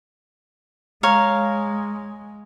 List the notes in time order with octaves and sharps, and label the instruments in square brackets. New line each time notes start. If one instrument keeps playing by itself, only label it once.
[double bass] G#3 [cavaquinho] C#5 F5 A#5